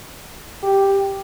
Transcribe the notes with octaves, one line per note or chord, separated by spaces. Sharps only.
G4